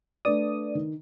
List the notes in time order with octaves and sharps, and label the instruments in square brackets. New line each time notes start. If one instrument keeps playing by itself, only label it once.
[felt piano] A3 D4 B4 [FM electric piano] D5 D#6
[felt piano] D#3